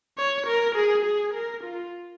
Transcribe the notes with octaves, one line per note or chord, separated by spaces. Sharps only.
C#5
A#4
G#4
G#4
A#4
F4